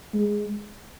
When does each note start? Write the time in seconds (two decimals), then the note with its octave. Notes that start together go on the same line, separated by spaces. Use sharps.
0.14 G#3